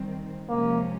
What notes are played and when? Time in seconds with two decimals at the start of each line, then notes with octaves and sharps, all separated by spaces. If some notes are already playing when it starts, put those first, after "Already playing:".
Already playing: D#3 G3 C4
0.49 C3 F3 G#3 A#3 C#4